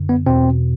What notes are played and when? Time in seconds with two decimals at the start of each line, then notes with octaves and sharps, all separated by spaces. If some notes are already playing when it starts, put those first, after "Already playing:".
Already playing: F#2 D3
0.09 B3
0.27 E2 B2 C4